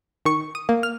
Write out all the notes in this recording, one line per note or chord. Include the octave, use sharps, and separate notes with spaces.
D#3 C#6
D#6
A#3
F6